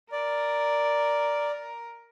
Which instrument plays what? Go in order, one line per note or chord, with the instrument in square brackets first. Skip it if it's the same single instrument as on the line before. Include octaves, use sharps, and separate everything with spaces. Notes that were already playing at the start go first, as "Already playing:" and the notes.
[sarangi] A#4 [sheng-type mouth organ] D5